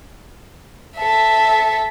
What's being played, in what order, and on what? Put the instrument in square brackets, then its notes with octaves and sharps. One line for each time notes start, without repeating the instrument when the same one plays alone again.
[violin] A4 E5